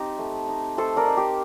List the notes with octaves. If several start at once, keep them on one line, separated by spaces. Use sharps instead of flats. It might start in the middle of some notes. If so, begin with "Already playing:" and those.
Already playing: C4 D#4 G4
A3
D#4
A3 A4 C5
A#4 D5
D#4
G4